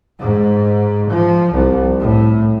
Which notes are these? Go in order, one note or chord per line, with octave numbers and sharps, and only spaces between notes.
G#2
F3
C2
A2